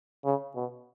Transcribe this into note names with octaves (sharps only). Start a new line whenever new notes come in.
C#3
B2